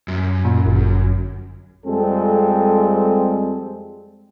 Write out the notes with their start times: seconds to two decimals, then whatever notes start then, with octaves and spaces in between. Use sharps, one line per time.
0.08 F#2
0.45 A#2
0.66 G1
1.86 F2 G3 G#3 C4 G#4 A4